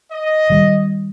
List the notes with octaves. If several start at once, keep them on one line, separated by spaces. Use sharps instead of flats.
D#5
D#3 G3